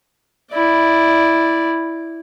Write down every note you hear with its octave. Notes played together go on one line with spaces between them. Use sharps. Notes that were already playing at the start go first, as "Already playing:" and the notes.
E4 D5